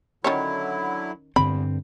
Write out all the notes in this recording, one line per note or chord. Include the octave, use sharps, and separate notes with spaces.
D3 D#3 F#3 C#4 E4 C#5
E2 G2 D3 C4 B5